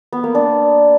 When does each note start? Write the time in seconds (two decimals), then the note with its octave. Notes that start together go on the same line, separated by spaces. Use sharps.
0.13 B3
0.24 A#3
0.35 D4